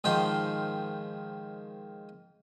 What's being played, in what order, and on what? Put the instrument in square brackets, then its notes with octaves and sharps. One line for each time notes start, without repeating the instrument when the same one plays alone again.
[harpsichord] G#2 D#3 F3 G5 C6